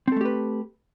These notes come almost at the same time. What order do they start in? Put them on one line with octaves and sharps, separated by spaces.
C4 A4 A3 G4 B4